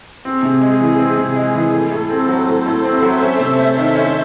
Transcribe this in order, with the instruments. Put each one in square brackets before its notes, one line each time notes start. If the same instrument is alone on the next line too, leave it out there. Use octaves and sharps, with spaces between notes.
[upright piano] C4 [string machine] G#4
[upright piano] C3
G#3
E3
C4
C3
G#3
E3
[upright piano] A2 [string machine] A4
[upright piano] A2
[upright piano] C4 [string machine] C5
[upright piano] F#3
[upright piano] A2 [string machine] C5
[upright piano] A2
[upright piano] C4 [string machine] E5
[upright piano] F#3
C#4
C3
A3
D#3
C#4